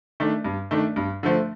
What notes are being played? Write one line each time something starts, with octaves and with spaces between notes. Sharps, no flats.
D#3 A3 D4
G2
D#3 A3 D4
G2
D3 F3 A3